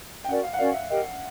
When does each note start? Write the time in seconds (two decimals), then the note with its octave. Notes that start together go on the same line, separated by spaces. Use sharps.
0.24 G5
0.28 C#4 F#4 A#4 D5 F#5
0.43 F5
0.53 F#5
0.58 C#4 F#4 A#4 D5 F5
0.74 E5
0.89 G4 A#4 D#5 G5